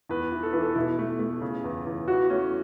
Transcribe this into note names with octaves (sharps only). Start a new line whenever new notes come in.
E2 B4
E3
A4
E3 B4
A4
B2 E4
A3
A3
C#3
E2
E2
E3 F#4
A3 C#4